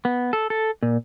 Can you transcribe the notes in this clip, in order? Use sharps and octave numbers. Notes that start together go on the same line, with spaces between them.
B3
A4
A4
A#2